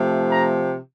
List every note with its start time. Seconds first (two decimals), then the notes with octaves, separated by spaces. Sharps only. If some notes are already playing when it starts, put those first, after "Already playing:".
Already playing: C3 F3 A3
0.31 A#5